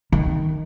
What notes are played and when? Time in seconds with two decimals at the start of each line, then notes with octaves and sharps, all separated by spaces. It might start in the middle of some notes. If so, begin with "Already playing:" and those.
0.12 D#3